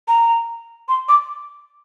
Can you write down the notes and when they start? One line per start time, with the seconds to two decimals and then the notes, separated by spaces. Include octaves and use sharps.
0.08 A#5
0.89 C6
1.09 D6